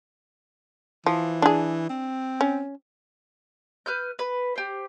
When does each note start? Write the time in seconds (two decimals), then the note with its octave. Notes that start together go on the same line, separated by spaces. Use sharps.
1.06 E3 F3
1.42 D4 G#4
1.89 C4
2.41 C#4
3.86 B4 F6 G6
4.19 B4
4.56 G4 C5